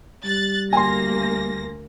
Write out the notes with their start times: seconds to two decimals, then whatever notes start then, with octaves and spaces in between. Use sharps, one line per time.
0.25 G3 F#6 A6
0.73 D2 A#3 G#5 C6 A#6